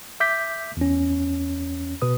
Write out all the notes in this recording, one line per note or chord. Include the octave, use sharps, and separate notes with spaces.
E5 D6 G6 B6
E2 C#4
B2 B4 D#6